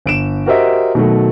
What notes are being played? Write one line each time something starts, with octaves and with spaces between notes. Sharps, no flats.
G1 D7 E7
F#4 G4 A#4 C5 D#5 E5
B2 D#3 F#3 A3